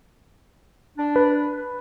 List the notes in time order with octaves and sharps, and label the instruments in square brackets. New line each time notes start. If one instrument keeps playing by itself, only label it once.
[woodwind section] D4
[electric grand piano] B4